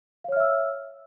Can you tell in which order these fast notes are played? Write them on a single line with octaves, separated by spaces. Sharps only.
F5 C#5 F6 E5 E6